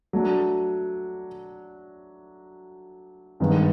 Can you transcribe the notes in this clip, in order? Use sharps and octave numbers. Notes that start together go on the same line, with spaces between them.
F#3 A3 D4
G2 D#3 G#3 B3